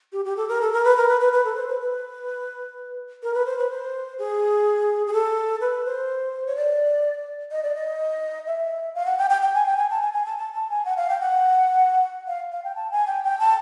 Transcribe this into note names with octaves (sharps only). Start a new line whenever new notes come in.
G4
G4
A4
A#4
A4
A#4
B4
A#4
B4
B4
B4
A4
C5
B4
B4
A#4
B4
C5
B4
C5
G#4
G#4
A4
B4
C5
C#5
D5
D#5
D5
D#5
E5
F5
F#5
G5
G5
G5
G#5
G5
G#5
A5
G#5
G#5
A5
A5
A5
G#5
F#5
F5
G5
F#5
F5
F5
G5
A5
G#5
G5
G5
A5